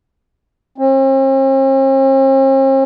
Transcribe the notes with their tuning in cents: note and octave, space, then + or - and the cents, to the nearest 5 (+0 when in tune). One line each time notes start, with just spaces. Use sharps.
C4 +45